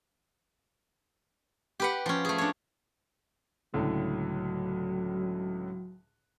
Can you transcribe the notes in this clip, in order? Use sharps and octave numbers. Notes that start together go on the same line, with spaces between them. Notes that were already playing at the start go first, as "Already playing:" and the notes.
G4 B4 F#5
F3 C#4
A3 G#4
D4 C#5
C#2 A2 D3 F#3